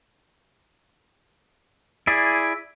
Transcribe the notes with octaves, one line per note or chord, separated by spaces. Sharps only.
E4 G#4 D5